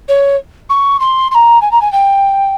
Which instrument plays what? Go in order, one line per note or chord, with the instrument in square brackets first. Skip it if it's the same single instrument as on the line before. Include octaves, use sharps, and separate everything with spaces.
[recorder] C#5
C#6
C6
C6
A#5
G#5
A#5
G#5
G5